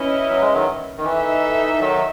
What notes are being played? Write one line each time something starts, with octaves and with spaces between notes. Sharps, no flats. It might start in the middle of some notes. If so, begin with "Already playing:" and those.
Already playing: C#4 E4 B4 D#5
F#3
G#3
D#3 F#3
D#3
E3 D#4 A4 E5
E3
D#3 F#3